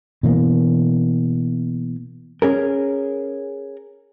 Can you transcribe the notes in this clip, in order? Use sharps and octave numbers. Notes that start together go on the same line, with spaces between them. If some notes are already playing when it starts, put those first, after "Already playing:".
B2 E3 A#3
C#4 G#4 A#4